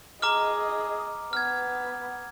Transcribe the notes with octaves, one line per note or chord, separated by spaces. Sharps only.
G#4 D#5 A#5 D6 F6
B3 F6 G#6